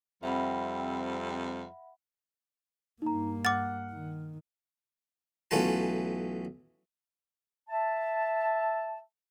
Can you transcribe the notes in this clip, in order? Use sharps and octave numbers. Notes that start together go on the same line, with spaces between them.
F2 C3 G3 C4 E5 F#5 B5
G2 A#3 D#4 A#5
F#5 D6 F6 A6
D#3
B1 E3 A3 C#4 F4 A5
E5 A5